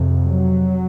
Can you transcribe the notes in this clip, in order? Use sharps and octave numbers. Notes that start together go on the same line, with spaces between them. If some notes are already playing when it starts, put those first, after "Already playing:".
Already playing: F2 C3
F#3